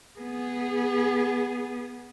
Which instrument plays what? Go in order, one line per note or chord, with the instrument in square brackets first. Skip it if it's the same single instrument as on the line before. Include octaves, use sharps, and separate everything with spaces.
[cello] B3 G#4